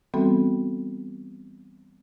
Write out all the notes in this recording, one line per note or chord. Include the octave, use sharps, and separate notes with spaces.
E3 G3 B3 C4 F#4 A4